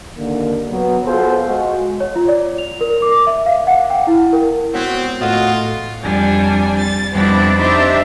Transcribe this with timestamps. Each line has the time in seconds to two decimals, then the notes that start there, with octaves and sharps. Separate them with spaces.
0.17 D#2 D3 A#3
0.69 F#3 B3
1.05 B3 F4 F#4 G#4 A4 C5
1.47 G#3 F#4
2.00 C#5
2.15 F4
2.28 D5
2.58 F7
2.81 A#4
3.02 D6
3.27 E5
3.46 F5
3.67 F#5
3.90 G5
4.07 E4
4.33 A#4
4.74 G#3 B3 C4 F#4 C#5 F#5
5.21 A2 F4 F#4 A4 D#5 D#6
6.02 F2 G3 D4 G#5
6.78 A6
7.12 F2 G3 B3 C4 D4 E4
7.58 D4 D#4 G4 C5 E5